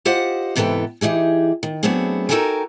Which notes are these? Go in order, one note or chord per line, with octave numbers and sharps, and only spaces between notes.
F4 G4 C5 D#5 F#5
G#2 C3 E3 B3 A4 G5
E3 D#4 G4 G#4
D#3
F#3 A3 B3 C4 D4 G#4
D#4 F#4 A4 A#4 G5 G#5